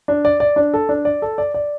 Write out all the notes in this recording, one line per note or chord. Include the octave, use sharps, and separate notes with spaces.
D4
D5
D5
D4
A4
D4
D5
A4
D5
D5